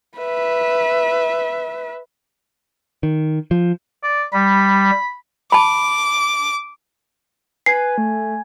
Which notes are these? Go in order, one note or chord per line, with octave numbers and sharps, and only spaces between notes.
B4 E5
D#3
F3
D5
G3 B5
A5 B5 D6
B4 G#5 G#6 C7
A3